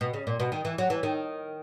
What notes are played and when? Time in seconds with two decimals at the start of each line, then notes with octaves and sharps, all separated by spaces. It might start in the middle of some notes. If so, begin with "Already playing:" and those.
0.01 B2
0.14 C#3
0.27 A#2
0.40 B2
0.52 D#3
0.65 E3
0.78 F#3
0.90 E3
1.03 D#3